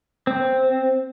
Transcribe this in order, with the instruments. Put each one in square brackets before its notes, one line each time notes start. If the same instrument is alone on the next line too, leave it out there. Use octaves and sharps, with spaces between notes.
[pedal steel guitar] C4